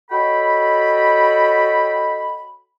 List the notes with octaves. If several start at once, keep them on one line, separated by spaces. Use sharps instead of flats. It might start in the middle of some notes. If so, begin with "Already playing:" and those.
F#4 A4 C#5 D#5 G5 B5